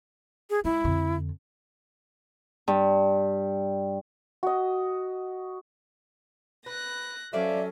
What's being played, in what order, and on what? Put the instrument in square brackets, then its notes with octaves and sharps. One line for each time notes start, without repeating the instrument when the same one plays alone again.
[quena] G#4
[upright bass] G#3 [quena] E4
[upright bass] F2 D3
[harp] G2
[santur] F#4 D#5
[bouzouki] B4 [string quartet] F#6 A#6
[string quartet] F#3 C#4 [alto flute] A4 [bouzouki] C5 D5 F5 [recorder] E5